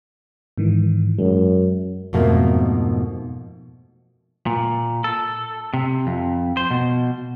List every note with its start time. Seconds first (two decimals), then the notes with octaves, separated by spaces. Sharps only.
0.58 G#2 D#3 E3
1.18 F#2 G#3
2.13 F2 G#2 B2 A3 A#3
4.46 A#2
5.04 A4
5.74 C3
6.07 F2
6.57 C5
6.71 B2